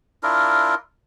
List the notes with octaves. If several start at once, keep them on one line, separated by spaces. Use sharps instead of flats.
D4 E4 F4 A#4